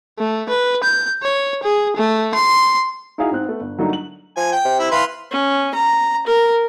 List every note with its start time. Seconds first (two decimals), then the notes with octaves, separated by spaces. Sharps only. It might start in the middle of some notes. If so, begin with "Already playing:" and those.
0.19 A3
0.49 B4
0.83 G6
1.23 C#5
1.63 G#4
1.96 A3
2.35 C6
3.18 D#4 E4 F#4 G#4 F5
3.31 G#2 C4 F#6
3.45 A3 B3
3.60 G1
3.78 D3 F#3 G3 A3 A#3 D#4
3.93 F#7
4.37 F3 G#5
4.52 G5
4.65 C3
4.79 E4
4.92 E3 B4 F5 C6
5.31 C#4
5.75 A#5
6.27 A#4